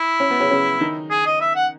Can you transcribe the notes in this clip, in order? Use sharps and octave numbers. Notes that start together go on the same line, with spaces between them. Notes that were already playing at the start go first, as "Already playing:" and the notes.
Already playing: E4
C#4
B3
C#3 C#4
C#3 C#4
D#3 D#4
G#4
D#5
E5
F#5